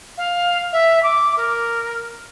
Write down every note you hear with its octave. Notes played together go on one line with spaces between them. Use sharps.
F5
E5
D6
A#4